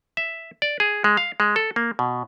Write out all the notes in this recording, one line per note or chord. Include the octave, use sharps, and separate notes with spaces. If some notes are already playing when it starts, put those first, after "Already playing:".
E5
D5
G#4
G#3
F5
G#3
A4
A#3
B2